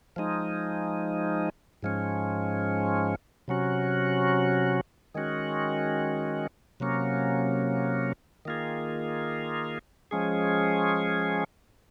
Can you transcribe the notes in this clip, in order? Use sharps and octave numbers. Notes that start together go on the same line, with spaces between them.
F3 G#3 D#4
G#2 F3 G#3 C#4
C3 F#3 C#4 F#4
D#3 G#3 C#4 F#4
C3 F#3 A#3 C#4
D#3 A#3 F4 G#4
F3 G#3 C#4 G#4